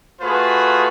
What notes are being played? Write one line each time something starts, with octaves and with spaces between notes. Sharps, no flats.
A3 F4 F#4 G#4 B4